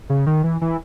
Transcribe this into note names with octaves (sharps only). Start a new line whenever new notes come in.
C#3
D#3
E3
E3